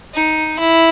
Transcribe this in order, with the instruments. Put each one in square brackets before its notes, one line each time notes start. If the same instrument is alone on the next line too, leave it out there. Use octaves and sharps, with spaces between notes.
[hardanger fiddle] D#4
E4